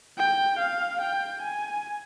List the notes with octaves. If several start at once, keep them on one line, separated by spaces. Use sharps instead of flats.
G5
F5
G5
G#5